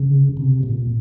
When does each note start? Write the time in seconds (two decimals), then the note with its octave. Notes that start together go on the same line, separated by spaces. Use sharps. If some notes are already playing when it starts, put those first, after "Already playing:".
Already playing: C#3
0.37 C3
0.63 A#2